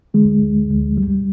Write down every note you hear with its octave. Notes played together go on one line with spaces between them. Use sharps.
D3 G#3
D2
D2
G3